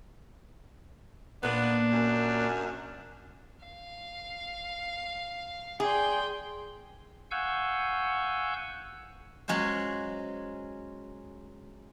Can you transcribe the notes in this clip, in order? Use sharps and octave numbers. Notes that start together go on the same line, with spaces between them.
A#2 A#3 B3 D4
F#2
F5
G#4 D5 G5 C6
F5 F#5 G#5 C#6 E6 G6
F#3 G#3 C#4 F4 C5